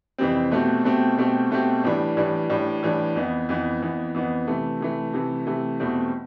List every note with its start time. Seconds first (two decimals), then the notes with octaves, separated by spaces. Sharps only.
0.18 F2 C3 E3 G3 C4
0.51 B2 A3 C4 G4
0.84 B2 A3 C4 G4
1.17 B2 A3 C4 G4
1.50 B2 A3 C4 G4
1.84 A2 E3 G3 D4
2.17 A2 E3 G3 D4
2.49 A2 E3 G3 D4
2.83 A2 E3 G3 D4
3.15 F2 E3 B3
3.49 F2 E3 B3
3.82 F2 E3 B3
4.14 F2 E3 B3
4.47 C3 E3 A3
4.80 C3 E3 A3
5.13 C3 E3 A3
5.47 C3 E3 A3
5.80 E2 B2 A3 C4 G4